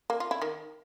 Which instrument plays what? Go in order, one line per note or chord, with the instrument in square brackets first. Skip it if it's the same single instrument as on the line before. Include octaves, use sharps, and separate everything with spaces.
[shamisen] A#3
F4
E4
D#3